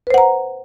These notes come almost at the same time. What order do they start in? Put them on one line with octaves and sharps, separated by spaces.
B4 C5 F#5 A#5